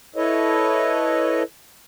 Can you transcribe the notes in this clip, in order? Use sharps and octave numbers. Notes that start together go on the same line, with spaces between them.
E4 A4 B4 C#5 D#5